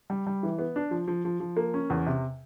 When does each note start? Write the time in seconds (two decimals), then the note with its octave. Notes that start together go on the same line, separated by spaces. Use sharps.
0.10 G3
0.27 G3
0.43 E3
0.59 B3
0.76 D4
0.91 F3
1.08 F3
1.25 F3
1.40 F3
1.57 A#3
1.74 C#4
1.90 E2
2.07 C3